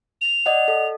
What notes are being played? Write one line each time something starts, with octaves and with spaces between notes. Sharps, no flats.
F7
D5 D#5 F#5
A4